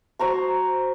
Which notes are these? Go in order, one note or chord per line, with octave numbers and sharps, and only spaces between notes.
F#4 C5 A#5 C#6